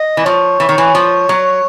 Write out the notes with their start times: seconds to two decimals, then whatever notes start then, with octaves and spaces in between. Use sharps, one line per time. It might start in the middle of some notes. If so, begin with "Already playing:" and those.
Already playing: D#5
0.17 E3
0.26 F3 C#5
0.60 E3
0.69 D#3
0.78 E3
0.95 F3
1.29 F#3